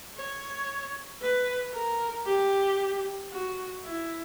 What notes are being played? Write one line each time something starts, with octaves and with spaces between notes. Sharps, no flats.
C#5
B4
A#4
G4
F#4
E4